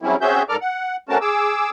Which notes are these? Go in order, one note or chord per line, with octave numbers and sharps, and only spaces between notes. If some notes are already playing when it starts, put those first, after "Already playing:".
C#3 F#3 G3 C4 C#4 E4
C4 C#4 F#4 G#4 E5 G6
G#2 A4 A#4 D5 D6 F6
F#5
A3 C4 C#4 F#4 A#4 A5
G#4 D6 E6